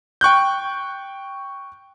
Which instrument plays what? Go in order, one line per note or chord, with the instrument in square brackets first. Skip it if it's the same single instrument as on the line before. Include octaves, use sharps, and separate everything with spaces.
[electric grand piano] G5 C#6 F#6 G6